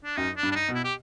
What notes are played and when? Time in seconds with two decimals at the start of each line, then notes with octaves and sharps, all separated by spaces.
0.04 D4
0.17 F#2 D#4
0.37 D4
0.43 G2
0.52 D4
0.55 D#4
0.69 B2
0.75 E4
0.84 G4